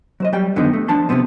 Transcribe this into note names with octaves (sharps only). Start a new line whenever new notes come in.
F#3 C5 D#5
F#3 G3 G5
F#2 D3 D#3 F3 B3 D#4
A3
F3 D4 A5 C6
C3 D#3 F3 B3 C4